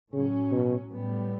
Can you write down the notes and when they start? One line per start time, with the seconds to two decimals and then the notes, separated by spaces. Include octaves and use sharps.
0.13 A2 C#3 F#3 C#4
0.51 B2
0.91 A2 G3 B3